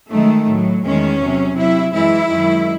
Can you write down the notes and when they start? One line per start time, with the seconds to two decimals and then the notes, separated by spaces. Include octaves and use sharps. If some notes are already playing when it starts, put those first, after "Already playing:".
0.10 F#2 D#3 G#3 A3
0.47 A2 F#3
0.83 E2 D#3 G#3 C#4
1.20 C3 F#3
1.56 C3 F#3 E4
1.92 F#2 E3 G#3 E4
2.29 F#2 D#3 G#3